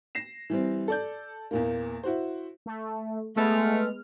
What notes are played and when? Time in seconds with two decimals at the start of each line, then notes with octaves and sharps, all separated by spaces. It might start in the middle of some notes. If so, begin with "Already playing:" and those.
0.15 A#6 C7 E7
0.50 E3 G3 C4
0.88 A4 D5 G6
1.51 E2 A#2 A#3
2.03 E4 F#4 C5
2.66 A3
3.36 G#3 A3 B3 F6